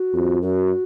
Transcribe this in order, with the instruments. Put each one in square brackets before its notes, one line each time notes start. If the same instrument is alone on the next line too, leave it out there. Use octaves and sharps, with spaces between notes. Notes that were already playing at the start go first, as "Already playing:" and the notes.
Already playing: [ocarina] F#4
[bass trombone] F2
[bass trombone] F#2 [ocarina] F#4